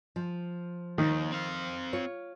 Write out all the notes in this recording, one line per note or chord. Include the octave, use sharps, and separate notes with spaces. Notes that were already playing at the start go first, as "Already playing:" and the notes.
F3
D#2 D#3
C4 F5
F4 C#5